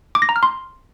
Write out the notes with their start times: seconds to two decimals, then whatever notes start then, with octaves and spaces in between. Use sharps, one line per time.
0.15 D6
0.22 A#6
0.29 A#5
0.36 F6
0.43 C6